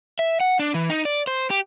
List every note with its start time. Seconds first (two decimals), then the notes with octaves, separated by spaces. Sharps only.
0.19 E5
0.40 F#5
0.59 D4
0.74 E3
0.90 D#4
1.05 D5
1.27 C5
1.50 G4